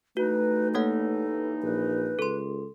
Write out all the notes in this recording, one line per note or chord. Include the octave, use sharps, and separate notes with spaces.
G2 E3 A3 D#4 F#4 B4
A#3 A4 C#5 F#5
A#1 B4
C#2 A4 C6